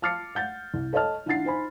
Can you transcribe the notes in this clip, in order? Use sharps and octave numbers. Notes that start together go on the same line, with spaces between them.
A5 D6 F6 A6 C7 C#7
F#5 G6 A6
C2
A4 C#5 D#5 A5 F6
D#3 D4 E4 F#5 A6 C7
D#4 C5 G#5 B5